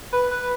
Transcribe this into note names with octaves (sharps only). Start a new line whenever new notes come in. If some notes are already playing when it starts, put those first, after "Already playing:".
B4
B4